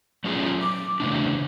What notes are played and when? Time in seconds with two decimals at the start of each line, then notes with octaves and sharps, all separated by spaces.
0.24 F#3 A3 C#4 F4 G#4
0.62 D6
1.00 C#3 E3 A3 D4